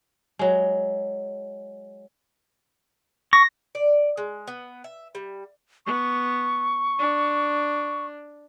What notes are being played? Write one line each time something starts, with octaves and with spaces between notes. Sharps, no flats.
F#3 G#3
C#6 A#6
D5
G#3
B3
E5
G3
B3 C#6
D4